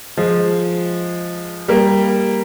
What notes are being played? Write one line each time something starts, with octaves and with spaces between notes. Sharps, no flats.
F3 G#3
G3 A#3